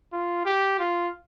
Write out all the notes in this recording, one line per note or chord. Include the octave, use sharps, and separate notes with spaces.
F4
G4
F4